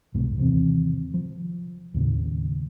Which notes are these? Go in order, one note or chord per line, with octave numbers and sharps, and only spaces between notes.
C2 F2 G#2 B2
D#2 C3 E3 C4
F3
D#2 A2 C#3